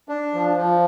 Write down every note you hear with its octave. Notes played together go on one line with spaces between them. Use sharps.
D4
F3
F3